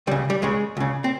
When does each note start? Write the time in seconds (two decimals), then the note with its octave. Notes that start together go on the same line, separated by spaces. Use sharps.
0.07 C#2 G3
0.11 C#3
0.30 G3
0.42 C#2 C#3 G#3
0.77 C#2 C#3
1.04 C4